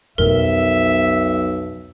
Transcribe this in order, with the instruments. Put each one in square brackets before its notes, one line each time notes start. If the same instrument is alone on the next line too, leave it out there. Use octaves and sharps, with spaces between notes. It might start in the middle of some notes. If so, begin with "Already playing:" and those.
[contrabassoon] B1 [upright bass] F2 B2 [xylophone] A#4 [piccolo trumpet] E5